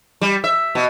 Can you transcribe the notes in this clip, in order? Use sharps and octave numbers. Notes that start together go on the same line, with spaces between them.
G3
E5
B2